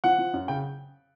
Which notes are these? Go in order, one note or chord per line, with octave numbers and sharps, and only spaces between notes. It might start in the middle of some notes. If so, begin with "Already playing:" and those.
F3 F#5
F3
F#2
C#3 G5